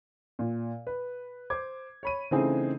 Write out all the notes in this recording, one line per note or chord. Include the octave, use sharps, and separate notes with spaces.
A#2
B4
C5 D6 G#6
C#5 B5 D#7
C#3 E3 A3 C4 D#4 G#4